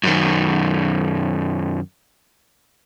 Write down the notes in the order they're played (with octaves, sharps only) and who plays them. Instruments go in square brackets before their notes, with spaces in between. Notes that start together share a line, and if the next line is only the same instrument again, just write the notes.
[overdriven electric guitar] F#2 D#3